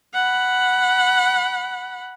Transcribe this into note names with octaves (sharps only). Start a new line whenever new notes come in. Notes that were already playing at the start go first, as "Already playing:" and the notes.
F#5 B5